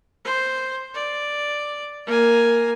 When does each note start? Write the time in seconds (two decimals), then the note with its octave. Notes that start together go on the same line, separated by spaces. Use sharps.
0.25 C5
0.95 D5
2.06 A#3 G#5